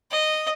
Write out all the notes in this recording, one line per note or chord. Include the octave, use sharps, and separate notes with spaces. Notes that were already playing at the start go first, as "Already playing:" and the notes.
D#5